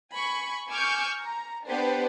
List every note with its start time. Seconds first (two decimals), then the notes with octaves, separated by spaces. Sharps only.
0.14 G#5 B5 C#6
0.70 G#5 C#6 D6 E6 F6 G6
1.22 A#5
1.68 B3 D4 G4 B4 C5